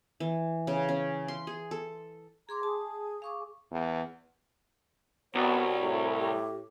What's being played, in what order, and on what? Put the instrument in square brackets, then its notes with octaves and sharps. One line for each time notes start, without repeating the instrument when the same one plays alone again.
[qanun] E3
C#3
C#4
C6
G#4
A4
[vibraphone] G#4 C6 D6 [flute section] A#5
[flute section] G#4 [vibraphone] A5
[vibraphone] F5 C#6 D6
[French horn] E2
[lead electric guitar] C2 [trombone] B3 [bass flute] F#4 [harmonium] C#5
[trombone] A2
[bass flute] G4